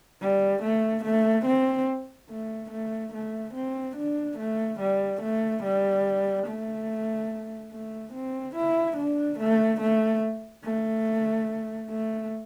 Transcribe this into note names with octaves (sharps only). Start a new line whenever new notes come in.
G3
A3
A3
C4
A3
A3
A3
C4
D4
A3
G3
A3
G3
A3
A3
C4
E4
D4
A3
A3
A3
A3